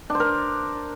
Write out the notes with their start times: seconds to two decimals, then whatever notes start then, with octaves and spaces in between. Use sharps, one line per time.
0.10 D4
0.15 C5
0.20 A#4